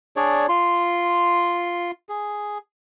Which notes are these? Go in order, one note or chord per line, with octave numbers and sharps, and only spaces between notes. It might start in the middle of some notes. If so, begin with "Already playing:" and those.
D4 G#4 C#5 D5
F4 C6
G#4